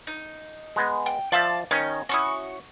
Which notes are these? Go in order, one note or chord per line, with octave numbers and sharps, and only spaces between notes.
D#4
G#3 B3 G#5
G5
F3 D5 E5 F5 A5
D#3 C#4 C#5 D#5
C#4 E4 F#4 C#6 D#6